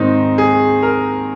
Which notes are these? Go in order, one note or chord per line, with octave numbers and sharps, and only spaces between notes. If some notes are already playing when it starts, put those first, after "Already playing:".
Already playing: G#2 D#3 C4 D#4
G#4
A#4